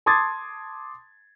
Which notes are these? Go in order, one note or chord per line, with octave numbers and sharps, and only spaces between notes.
A5 C6 D6 D#6 G#6 A6